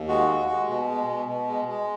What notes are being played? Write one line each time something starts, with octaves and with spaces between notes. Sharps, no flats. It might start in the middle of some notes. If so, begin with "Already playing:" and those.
Already playing: D#2
G#3 F#4
G#3
G#3
B2
G#3
B2
B2
G#3
G#3